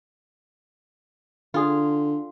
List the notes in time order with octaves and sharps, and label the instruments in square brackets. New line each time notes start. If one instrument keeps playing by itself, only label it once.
[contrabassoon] D3 [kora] F4 G#4